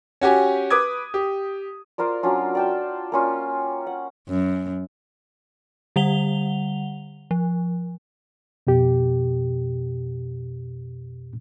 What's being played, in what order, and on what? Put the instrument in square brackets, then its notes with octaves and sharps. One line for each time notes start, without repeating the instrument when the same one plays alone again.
[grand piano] C#4 F#4 G4 G#5
B4 D6 D#6 G#6
G4
[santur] F4 A#4 C5 D5
F#3 C#4 D4 F4
D5 G5 A5
A#3 C#4 F4
F#5
[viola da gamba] F#2
[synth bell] D3 G3 F#5 F7 G7
F3
[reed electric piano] F2 B2 G4